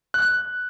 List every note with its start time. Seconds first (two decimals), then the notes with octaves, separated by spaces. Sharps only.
0.14 F#6